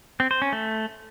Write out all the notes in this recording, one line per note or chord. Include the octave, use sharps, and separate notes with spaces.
C4
C5
C#4
A3